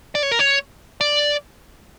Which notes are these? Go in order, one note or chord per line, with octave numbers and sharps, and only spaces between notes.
D5
C#5
A#4
C#5
D5